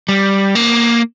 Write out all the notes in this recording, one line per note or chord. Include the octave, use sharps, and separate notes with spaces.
G3
A#3